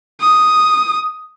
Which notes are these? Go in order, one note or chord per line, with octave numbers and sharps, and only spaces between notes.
D#6